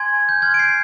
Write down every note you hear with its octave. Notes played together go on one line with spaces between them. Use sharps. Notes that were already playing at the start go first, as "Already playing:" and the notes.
Already playing: G#5 C6 G#6
G6
C6 F6 G#6
D7
C7